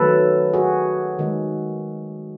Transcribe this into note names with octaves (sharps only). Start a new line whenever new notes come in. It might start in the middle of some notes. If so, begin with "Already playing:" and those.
Already playing: D#3 F#3 A3 A4 B4
F#4 G#4
D#3 G#3